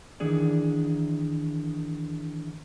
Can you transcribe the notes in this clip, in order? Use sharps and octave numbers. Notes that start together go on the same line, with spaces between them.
D#3 E3 D4 G#4 D5